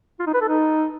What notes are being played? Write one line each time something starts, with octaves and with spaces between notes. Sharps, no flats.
F4
D#4
B4
A4
D#4